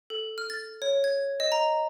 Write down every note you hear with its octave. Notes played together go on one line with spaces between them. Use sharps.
A4
F6
A6
C#5
G#6
D#5
A#5